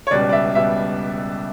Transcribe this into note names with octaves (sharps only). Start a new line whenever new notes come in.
C#5
C#2 B2 G3 D5
D5
E5
B2 G3 E5